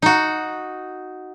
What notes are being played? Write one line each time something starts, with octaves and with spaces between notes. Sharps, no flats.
D#4 F#4